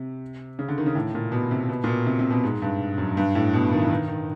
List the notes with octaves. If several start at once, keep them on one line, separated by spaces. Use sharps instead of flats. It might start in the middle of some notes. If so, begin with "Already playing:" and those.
Already playing: C3
C#3
D3
D#3
C#3
A2
A#2
B2
C3
B2
A#2
B2
C3
C3
B2
G#2
G2
F#2
G2
A2
B2
D#3
E3
D#3
D#3